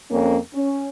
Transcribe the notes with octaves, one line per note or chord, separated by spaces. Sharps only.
F2 A#3 C#4
C#4